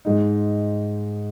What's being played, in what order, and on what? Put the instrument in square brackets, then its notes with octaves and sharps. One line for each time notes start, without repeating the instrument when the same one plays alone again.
[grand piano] G#2 G#3 D#4